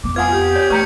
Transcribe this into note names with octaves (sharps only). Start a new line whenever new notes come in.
F2 B3 D6
F4 B4 F#5 G#5 D#6 G#6
G4
C#5 D5
A3 B4 A#5 C#6 C#7